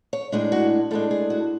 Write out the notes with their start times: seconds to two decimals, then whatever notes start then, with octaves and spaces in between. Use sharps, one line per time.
0.13 C#5
0.32 A2 G#3 D4
0.52 F#4
0.91 A2 G#3 D4 A4
1.11 G#4
1.30 F#4